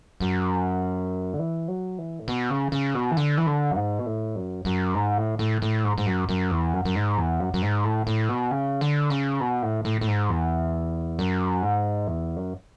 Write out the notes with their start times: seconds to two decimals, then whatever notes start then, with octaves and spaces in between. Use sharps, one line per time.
0.20 F#2
1.34 D3
1.39 E3
1.68 F#3
1.98 E3
2.19 A2
2.28 B2
2.50 C#3
2.72 C#3
2.94 B2
3.11 E3
3.17 D3
3.37 E3
3.46 D3
3.71 F#2
3.76 G#2
3.99 B2
4.06 A2
4.36 F#2
4.65 F#2
4.95 G#2
5.17 A2
5.39 A2
5.62 A2
5.84 G#2
5.98 G#2
6.06 F#2
6.29 F#2
6.51 E2
6.73 F#2
6.85 F#2
6.95 G#2
7.18 E2
7.40 F#2
7.54 F#2
7.62 G#2
7.84 A2
8.07 A2
8.29 B2
8.51 C#3
8.81 D3
9.10 C#3
9.40 B2
9.62 A2
9.85 A2
10.01 A2
10.08 G#2
10.29 E2
11.19 F#2
11.62 G#2
12.07 E2
12.36 F#2